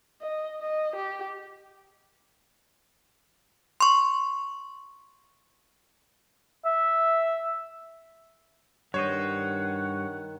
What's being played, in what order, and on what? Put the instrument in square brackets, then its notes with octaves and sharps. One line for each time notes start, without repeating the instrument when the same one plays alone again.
[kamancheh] D#5
D#5
G4
[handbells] C6 C#6
[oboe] E5
[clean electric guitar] G2 C5 D#5 [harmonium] D#3 [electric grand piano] C#5 [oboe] F#5